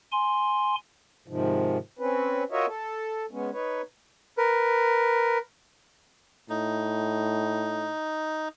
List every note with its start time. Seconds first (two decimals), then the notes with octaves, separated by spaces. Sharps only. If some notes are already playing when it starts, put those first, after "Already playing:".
0.12 G#5 C6
1.28 G#2 C3 D#3 F3
1.99 C4 C#4 B4
2.51 F4 F#4 A#4 C#5 D#5 E5
2.68 A4
3.31 G#3 B3 C#4
3.52 D#4 B4 C#5
4.37 A#4 B4
6.50 A2 D#4